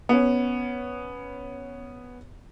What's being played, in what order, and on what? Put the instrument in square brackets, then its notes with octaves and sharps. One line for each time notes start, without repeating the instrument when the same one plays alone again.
[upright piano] B3 C#4